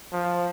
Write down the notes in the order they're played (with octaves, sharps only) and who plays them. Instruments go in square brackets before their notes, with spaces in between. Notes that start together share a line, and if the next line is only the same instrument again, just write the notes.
[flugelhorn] F3